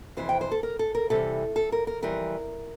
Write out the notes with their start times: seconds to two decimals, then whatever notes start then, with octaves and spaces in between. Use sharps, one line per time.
0.17 F2 C3 E3 C5
0.29 G5
0.41 C5
0.51 A4
0.63 A#4
0.79 A4
0.95 A#4
1.10 C3 E3 G3 A4
1.56 A4
1.72 A#4
1.87 A#4
2.02 F2 E3 G3 A#4